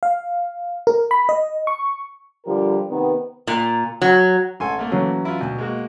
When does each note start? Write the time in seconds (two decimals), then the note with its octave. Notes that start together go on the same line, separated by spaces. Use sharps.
0.03 F5
0.87 A#4
1.11 B5
1.29 D#5
1.67 C#6
2.46 D3 F3 G3 G4 A#4
2.90 C3 D#3 B3
3.47 A#2
4.02 F#3
4.60 A1 A4 G#5 C6
4.79 A3 A#3
4.90 E3 F#3 C#4
5.25 E4 F4
5.41 D2 B2
5.59 G#3 A#3 F#4